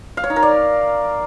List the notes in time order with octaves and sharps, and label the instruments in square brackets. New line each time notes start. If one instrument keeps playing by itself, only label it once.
[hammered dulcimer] F5
C#5
D#4
A#4
D5